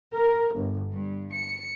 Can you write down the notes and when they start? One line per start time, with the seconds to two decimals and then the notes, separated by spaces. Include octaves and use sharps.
0.13 A#4
0.56 G1
0.90 G2
1.32 C#7